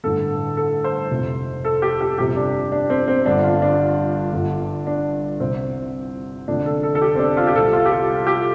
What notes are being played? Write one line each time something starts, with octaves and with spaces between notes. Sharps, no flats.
A1 G2 D3 A4
A4
C5
F1 F2 C3
A4
G4
G4
G1 F2 C3 G4
D4
D4
C4
C4
G1 G2 D3 D4
F4
D4
G1 G2 D3
D4
C2 C3 C4
F1 F2 D3 D4
A4
A4
A4
G4
C4
D4
F4
G4
C2 C3 A4
F4
G4
A4
G4